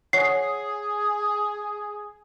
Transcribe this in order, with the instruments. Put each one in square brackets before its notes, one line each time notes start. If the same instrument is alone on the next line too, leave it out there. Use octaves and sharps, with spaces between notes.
[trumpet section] G#4 [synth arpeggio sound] C#5 F#5 [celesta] C7